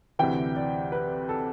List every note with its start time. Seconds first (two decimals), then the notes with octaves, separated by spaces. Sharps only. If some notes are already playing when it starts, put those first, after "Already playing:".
0.19 D2 C3 E3 G5
0.56 D5
0.92 B4
1.29 A4